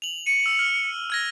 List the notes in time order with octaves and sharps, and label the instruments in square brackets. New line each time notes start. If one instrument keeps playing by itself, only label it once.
[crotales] F7 F#7
[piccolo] C#7 [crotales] D#7
[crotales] E6
F6
F6 G#6 A#6